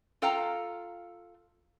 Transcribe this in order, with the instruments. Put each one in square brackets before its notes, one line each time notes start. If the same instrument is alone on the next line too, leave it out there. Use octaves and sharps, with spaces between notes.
[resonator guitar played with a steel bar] F4 A4 F5 G5 A#5